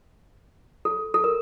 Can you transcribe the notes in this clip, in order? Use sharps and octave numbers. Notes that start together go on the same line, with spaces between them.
A4
A4
A#4